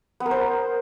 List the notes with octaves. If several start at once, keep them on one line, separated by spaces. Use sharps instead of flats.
B3
A#4
C5